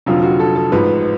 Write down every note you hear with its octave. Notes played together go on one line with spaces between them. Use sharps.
F1 F2 D3 F#3 F4
F#4
A4
A4
A1 G#2 F3 B4